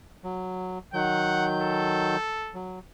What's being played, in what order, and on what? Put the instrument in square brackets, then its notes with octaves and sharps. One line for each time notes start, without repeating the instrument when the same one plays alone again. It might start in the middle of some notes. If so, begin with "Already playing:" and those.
[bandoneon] F#3
[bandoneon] D#3 F#3 G6 [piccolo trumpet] F#5
[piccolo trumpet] A4
[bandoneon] F#3